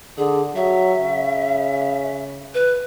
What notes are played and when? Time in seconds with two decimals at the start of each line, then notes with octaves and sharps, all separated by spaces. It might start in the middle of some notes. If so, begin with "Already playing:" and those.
0.18 D3 G#4
0.56 F#3 E5
1.01 C#3
2.54 B4